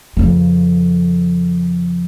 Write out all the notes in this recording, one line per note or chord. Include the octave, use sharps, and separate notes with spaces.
F2 C#3